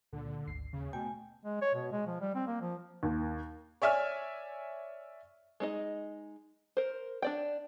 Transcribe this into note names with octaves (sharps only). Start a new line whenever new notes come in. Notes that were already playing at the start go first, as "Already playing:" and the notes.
C#2 A#2 D3
G#1 D2 C7
D#2 C#3
B2 A3 G5 G#5
G#3
C#5
B2
G#3
F3
G3
C4
A#3
F3
D#2
C#5 D5 E5 G#5 F6
G#3 D#4 D#5
A#4 C5
D4 D5 G5